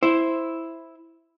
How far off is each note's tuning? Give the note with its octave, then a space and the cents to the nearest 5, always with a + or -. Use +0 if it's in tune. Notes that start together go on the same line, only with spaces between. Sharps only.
E4 +0 C5 +0